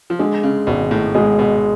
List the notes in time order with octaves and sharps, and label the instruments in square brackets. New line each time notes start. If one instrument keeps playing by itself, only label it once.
[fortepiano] F3
[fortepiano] D3 [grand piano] G#3
[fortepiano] C#3
[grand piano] G#1 [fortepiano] B2
[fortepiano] A2
[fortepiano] B2 [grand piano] G#3
[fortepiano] B2